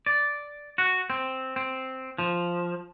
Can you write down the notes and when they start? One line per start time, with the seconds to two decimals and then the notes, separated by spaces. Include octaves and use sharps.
0.06 D5
0.78 F#4
1.10 C4
1.56 C4
2.18 F3